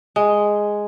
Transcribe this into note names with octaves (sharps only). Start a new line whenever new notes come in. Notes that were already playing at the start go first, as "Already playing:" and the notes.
G#3